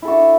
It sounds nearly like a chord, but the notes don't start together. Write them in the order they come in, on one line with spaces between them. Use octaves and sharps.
E4 A4 F#4 D4